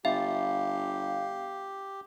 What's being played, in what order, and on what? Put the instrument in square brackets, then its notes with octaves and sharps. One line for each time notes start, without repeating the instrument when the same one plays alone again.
[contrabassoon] G1 [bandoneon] G4 [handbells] E5 [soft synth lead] F5